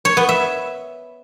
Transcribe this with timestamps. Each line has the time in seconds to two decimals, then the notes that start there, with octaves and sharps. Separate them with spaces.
0.05 C#5
0.17 B3
0.29 E5